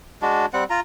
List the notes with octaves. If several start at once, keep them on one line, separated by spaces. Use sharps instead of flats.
G#3 D4 F#4
G3 C4 F#5
F4 A#5